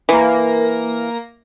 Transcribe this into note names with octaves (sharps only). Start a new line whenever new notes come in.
E3 A#3 A#6